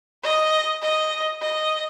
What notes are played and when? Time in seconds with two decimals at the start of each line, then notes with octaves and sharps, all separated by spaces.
0.24 D#5
0.82 D#5
1.41 D#5